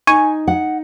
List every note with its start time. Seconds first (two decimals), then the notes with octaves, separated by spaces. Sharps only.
0.07 D#4 G#5 C#6
0.48 F#5